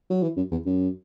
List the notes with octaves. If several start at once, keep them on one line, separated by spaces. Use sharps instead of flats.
F#3
E3
F#2
E2
F#2